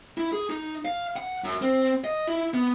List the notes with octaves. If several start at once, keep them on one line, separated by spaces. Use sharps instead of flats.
E4
G#4
D#4
F5
F#5
F#2
C4
D#5
E4
B3